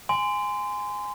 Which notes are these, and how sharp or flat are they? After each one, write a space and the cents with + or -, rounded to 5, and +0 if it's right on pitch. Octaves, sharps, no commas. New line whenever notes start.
G#5 -5 C6 -25